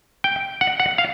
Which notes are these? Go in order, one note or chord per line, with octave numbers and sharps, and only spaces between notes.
G5
F#5
F#5
F5